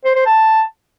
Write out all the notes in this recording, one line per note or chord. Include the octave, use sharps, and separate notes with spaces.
C5
C5
A5